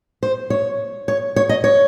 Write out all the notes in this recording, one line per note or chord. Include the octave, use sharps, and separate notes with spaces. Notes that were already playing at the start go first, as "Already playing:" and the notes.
C5
C#5
C#5
C#5
D#5
C#5